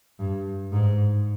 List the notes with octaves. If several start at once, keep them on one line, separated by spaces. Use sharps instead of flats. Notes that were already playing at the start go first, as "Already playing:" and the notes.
G2
G#2